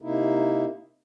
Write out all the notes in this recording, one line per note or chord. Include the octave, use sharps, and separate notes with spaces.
C3 A#3 D#4 E4